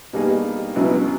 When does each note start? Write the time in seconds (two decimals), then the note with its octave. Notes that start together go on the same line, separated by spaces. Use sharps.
0.13 B2 G3 A#3 D#4 G#4
0.75 C#2 B2 F#3 B3 E4